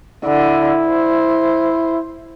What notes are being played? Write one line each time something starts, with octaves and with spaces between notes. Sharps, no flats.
D3 E4
C5